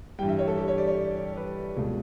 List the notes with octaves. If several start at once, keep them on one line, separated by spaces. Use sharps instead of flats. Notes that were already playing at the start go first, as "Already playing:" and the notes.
G2 E3 G3 G5
E5
C#5
A4
G4
C#5
D5
C#5
B4
C#2 B2 A3